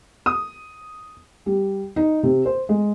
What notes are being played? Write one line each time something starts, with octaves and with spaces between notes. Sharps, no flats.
D#6
G3
D#4
C3
C5
G#3